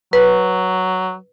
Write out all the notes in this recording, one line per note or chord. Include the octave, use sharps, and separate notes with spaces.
F#3 B4